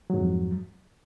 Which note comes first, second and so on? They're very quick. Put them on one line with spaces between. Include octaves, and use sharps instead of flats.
F#3 G#2 F2